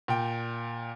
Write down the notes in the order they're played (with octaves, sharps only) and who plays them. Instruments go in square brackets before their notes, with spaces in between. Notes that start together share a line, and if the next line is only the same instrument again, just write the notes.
[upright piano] A#2 G5